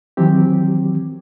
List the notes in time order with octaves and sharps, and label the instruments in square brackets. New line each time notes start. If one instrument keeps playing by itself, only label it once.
[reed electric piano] D#3 E3 F#3 C4 G4